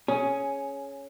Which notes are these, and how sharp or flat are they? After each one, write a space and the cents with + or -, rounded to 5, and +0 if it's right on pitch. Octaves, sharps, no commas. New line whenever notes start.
C#4 +0 G#4 +15